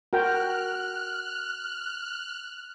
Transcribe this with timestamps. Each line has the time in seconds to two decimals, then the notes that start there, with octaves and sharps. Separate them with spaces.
0.13 F#4 A#4 G5 F6 F#6